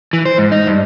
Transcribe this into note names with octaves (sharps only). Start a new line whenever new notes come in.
E3
C5
G#2
D#4
G2